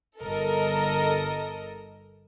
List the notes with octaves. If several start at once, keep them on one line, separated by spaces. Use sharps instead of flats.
G1 A4 A#4 D#5